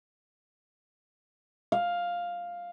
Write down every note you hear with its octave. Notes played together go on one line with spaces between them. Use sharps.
F5